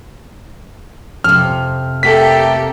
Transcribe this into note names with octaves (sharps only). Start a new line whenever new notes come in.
F2 C3 F6
A3 A#3 G4 A4 B6